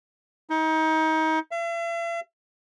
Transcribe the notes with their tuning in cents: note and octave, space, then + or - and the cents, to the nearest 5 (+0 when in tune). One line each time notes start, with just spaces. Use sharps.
D#4 +30
E5 +45